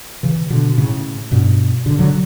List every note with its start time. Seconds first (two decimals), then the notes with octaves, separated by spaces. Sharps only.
0.23 C#3 E3
0.50 B2 D3
0.77 A2 C#3
1.32 G2 B2
1.86 B2 D3
1.99 D3 F#3